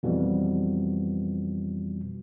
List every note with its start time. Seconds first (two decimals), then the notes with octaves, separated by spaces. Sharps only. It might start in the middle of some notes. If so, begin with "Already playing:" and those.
0.03 F2 B2 E3 G3